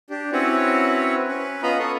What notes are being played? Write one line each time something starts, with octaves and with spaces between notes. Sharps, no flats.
D4 G4
C4 C#4 E4 F#4 B4 C#5
C#4 B4
B3 C#4 F4 D#5 A#5 B5
A4 C#6 D#6